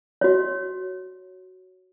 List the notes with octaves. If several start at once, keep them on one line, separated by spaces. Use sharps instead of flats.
F#4 C#5